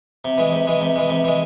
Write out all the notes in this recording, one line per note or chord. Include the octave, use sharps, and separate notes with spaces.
C3
E3 G#3
C3
E3 G#3
C3
E3 G#3
C3
E3 G#3